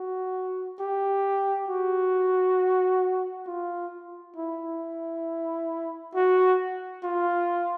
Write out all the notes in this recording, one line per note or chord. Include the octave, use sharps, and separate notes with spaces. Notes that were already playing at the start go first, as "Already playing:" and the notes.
Already playing: F#4
G4
F#4
F4
E4
F#4
F4